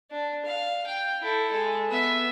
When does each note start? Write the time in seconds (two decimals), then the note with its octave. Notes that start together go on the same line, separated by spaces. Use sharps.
0.11 D4
0.45 F5
0.87 G5
1.22 E4 A4
1.52 G#3 A4
1.88 B3 E5